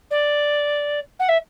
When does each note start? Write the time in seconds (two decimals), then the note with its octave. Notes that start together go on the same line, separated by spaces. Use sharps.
0.11 D5
1.20 F#5
1.29 E5